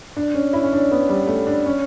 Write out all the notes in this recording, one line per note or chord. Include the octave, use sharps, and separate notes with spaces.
D4
C#4
E4
C#4
D4
B3
G3
A3
D4
C#4